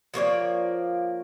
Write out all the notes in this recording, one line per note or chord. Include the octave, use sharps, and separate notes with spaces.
F3 A#3 C#5 D5